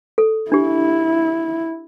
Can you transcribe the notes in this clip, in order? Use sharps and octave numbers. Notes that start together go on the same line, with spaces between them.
A4
D4 E4 G4